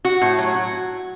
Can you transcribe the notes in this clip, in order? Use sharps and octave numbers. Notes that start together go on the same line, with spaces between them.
F#4
A2
F#3
F#4